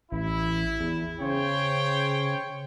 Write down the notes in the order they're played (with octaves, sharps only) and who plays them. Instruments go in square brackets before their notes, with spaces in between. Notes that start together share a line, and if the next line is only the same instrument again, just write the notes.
[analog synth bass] A1 [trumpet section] E4
[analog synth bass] E2
[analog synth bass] C#3 [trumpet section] C5 C#5 G5